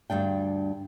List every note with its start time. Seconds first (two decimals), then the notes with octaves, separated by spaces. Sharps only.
0.10 D2 G2 D4 G5